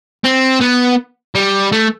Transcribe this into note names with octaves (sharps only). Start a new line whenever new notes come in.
C4
B3
G3
A3